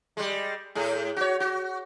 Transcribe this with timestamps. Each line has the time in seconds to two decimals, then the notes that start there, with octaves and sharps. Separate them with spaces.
0.17 G3 G#3
0.75 A2 G#4
1.17 F#4 C#5
1.40 F#4